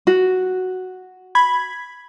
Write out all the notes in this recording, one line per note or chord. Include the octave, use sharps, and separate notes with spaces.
F#4
B5 G#6